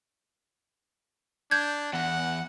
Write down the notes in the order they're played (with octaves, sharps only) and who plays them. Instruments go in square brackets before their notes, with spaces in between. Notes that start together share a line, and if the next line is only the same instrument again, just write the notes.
[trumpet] D4 [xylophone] G6 G#6
[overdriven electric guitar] E2 [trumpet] F#5